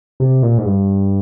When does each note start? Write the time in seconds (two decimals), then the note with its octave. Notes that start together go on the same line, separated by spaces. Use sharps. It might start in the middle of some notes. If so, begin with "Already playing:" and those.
0.20 C3
0.42 A#2
0.58 G#2
0.65 G2